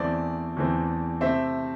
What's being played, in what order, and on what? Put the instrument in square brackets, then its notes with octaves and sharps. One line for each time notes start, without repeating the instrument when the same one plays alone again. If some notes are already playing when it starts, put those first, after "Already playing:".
Already playing: [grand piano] E2 E3 A3 C4 D5
E2 E3 A3 C4
C3 A3 C4 E5